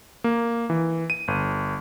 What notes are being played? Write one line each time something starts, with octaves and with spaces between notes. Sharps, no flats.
A#3
E3
D#7
G1